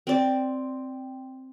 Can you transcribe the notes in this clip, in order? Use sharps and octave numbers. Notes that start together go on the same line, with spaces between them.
C4 D5